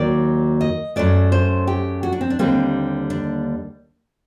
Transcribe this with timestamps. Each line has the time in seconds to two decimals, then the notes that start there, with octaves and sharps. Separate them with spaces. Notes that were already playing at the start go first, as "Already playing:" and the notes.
Already playing: D#2 D#3 F#3 A#3 D5
0.61 D#5
0.96 F#2 F#3 A3 D5
1.32 C5
1.67 G4
2.03 F#4
2.13 D4
2.21 C4
2.30 D4
2.39 D#2 D3 G3 A#3 C4
3.10 D4